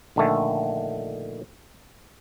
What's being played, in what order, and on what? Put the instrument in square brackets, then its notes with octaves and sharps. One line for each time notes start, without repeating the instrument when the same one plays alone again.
[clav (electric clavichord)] A#1 D3 D#3 A3